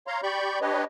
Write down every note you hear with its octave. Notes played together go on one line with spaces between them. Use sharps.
C#5 F5 A#5 C6
G4 D5 B5 C#6 G6
D4 G4 B4 C#5 D#5